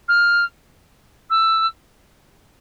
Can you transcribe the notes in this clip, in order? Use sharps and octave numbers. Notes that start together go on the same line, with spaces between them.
F6
E6